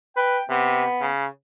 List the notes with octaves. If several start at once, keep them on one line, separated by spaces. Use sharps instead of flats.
B4 G5
C3 B3
C#3